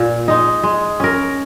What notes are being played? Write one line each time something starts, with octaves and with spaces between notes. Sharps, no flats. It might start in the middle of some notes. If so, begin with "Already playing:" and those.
Already playing: A#2
G#3 D#4
G#3
C#4 A#4